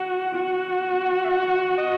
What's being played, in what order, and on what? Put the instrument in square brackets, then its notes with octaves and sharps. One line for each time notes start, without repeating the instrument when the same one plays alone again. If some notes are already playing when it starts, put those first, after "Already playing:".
Already playing: [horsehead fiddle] F#4 [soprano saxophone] F#5
[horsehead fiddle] F#4
[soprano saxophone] E5
F#5
D#5